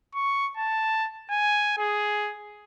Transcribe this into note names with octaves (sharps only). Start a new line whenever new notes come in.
C#6
A5
G#5
G#4